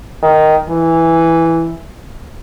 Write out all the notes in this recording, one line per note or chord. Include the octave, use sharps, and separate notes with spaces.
D#3
E3